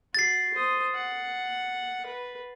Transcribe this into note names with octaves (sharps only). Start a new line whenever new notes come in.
F#4 A6 C7
C5 D#6
F#5
B4